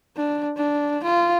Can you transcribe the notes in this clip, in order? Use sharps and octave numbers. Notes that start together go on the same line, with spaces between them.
D4
D4
F4